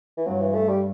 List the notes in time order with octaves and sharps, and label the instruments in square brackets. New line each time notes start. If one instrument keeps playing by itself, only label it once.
[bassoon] E3
[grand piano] G2 [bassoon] F#3
[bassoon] E3
A3
G3